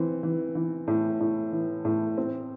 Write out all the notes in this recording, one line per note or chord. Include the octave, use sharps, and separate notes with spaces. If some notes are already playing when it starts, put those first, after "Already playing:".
Already playing: E3 C4
E3
E3
A2
A2
E3
A2
C4